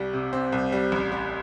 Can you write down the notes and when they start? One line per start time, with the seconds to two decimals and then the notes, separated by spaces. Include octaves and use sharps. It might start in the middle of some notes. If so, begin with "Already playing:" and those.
Already playing: C2 G3
0.13 C3
0.33 C4
0.52 C2
0.72 G3
0.92 A1
1.12 G3